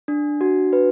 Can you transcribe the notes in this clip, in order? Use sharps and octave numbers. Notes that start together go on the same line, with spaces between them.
D4
F#4
B4